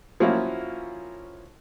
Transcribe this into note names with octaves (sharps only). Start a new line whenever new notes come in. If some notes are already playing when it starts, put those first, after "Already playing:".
F3 F#3 A#3 C#4 E4